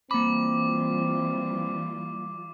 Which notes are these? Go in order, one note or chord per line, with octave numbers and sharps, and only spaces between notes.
E3 G3 A#3 C4 F4 B5 D6